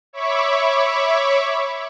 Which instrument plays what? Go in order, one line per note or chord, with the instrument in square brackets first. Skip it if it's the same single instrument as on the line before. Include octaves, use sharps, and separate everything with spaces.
[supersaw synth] C#5 E5 B5 C#6 D6